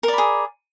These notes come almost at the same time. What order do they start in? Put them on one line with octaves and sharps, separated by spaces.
A#4 D5 B5 G#4